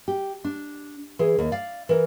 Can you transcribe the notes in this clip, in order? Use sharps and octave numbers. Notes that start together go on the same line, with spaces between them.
G4
D4
E3 G#4
D#2
D5 F5
E3 A#4